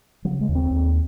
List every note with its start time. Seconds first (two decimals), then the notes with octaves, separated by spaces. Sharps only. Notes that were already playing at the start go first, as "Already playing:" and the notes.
0.25 C#3 F#3
0.41 G#3
0.49 D#2
0.55 C4
0.71 D#2